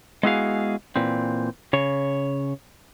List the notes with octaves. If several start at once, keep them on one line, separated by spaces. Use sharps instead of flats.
G#3 B3 E4 F#4 G#4 F5
A#2 E3 C4
C#3 C#5